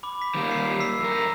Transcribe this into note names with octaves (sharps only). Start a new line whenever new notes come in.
B5 D6
B6
D#3 G3 A#3
C7
E6 B6 C7
F2 A#4